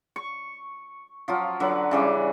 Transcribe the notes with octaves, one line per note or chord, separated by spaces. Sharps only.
C#6
F3 F#3 F4
D3 F#3 B4
C#3 E3 G3